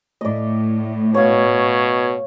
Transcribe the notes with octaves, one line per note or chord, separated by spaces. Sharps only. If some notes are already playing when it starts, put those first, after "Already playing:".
A2 A3 D5 D#5
B2 C#5 F5 G#6